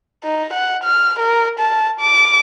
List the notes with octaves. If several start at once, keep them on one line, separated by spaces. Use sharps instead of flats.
D#4
F#5
F6
A#4
A5
D6